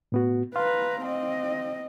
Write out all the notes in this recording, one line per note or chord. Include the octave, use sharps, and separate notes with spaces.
A2 B3 F#4
B4 F5 A#5 C6
C4 D#5